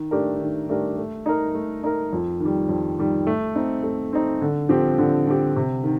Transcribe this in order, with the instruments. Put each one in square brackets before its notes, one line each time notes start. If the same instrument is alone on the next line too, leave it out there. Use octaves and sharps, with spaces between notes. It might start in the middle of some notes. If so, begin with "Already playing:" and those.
Already playing: [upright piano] D#3
A3 D4 G4 A#4
D#3
A3 D4 G4 A#4
A3
D#4 A#4
A3
D#4 A#4
F2
D#3
G3
F2
D#3 G3
A3
C4 D#4
A3
C4 D#4
D3
F3 C4 G4
D3
F3 C4 G4
C3
D#3